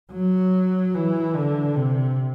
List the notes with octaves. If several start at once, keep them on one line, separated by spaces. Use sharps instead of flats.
F#3
E3
D3
C3